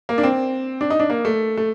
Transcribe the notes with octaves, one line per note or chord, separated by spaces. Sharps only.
A#3
D4
C4
D4
D#4
D4
A#3
A3
A3